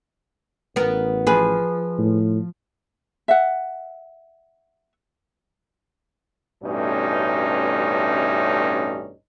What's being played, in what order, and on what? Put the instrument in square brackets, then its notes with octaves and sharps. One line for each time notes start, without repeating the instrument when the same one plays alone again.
[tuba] A1 [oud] B3 A#4
[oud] F3 [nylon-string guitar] G#4 B4
[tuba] A2
[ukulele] E5 F#5
[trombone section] A1 G2 B2 A3 C#4 D#4